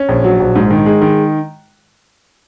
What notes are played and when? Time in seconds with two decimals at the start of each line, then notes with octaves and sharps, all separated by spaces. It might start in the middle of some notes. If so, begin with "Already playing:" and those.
Already playing: C#4
0.09 A#1
0.24 F#3
0.40 A#1
0.55 G#2
0.71 D#3
0.86 G#3
1.02 D#3